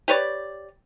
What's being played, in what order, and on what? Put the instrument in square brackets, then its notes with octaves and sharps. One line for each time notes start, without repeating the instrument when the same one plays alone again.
[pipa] G4 B4 C#5 D5